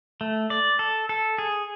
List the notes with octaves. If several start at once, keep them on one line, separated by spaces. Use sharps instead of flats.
A3
D5
A4
A4
G#4